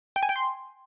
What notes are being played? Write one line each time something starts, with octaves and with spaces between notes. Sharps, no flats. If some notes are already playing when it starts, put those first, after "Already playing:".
G5
G#5
G5
C6